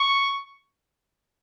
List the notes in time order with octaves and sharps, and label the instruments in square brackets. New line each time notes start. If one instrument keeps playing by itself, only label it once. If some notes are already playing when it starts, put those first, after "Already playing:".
Already playing: [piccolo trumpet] C#6